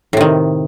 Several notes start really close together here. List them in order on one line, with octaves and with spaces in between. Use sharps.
A2 C3 D#3